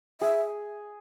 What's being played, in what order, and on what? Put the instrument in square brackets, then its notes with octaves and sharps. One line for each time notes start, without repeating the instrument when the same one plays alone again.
[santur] G#4 [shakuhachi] E5